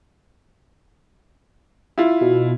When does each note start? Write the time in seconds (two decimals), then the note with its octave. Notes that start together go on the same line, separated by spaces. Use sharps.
1.98 E4 F4
2.21 B2